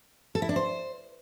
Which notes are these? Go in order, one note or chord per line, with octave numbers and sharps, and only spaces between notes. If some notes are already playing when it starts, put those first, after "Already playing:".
A4
E4
D4
C5